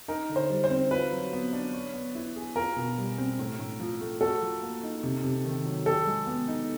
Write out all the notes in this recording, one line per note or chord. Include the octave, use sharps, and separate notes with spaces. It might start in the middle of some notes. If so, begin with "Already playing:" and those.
D#4 A#4
D3
C5
G3
C5
C4
F4 B4
F#3
B3
D4
C#5
B3
E4
G#4
F4 A#4
B2
G3
C4
A2
A2
F3
A3
F#4 A4
F3
A#3
D#4
C3
C3
D#3
F#3
G4 A4
G#3
B3
D#4